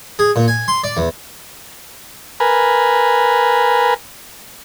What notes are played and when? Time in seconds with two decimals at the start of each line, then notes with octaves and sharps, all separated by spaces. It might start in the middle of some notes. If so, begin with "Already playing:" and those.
0.19 G#4
0.36 A#2
0.48 G#5
0.68 C6
0.84 D5
0.97 E2
2.40 A#4 B4 G#5